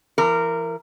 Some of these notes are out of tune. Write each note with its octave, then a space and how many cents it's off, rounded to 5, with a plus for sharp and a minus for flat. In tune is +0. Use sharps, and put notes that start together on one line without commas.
E3 +30 A#4 -15